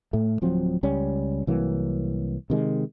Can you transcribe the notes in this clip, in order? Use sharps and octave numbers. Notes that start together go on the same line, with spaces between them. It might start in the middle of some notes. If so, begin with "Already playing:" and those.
A2 A3
D1 F3 F#3 C4
C#2 G3 C#4
C2 E3 F#3 A#3
C3 D#3 G#3